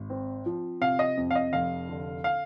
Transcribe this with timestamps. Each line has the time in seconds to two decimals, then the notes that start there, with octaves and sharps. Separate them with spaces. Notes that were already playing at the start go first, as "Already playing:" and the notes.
Already playing: G#1
0.10 C4
0.46 F3
0.81 C3 F5
0.99 D#5
1.17 F2
1.31 F5
1.35 D#5
1.53 F1 F5
1.89 D3
2.24 F5